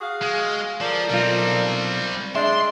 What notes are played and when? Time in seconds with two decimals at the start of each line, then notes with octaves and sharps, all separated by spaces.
0.01 F#4 G#4 F5
0.21 G#3
0.81 F3 A4 A#4 D5
1.10 B1 G3 C4 F4
2.36 G#3 D4 E5 C6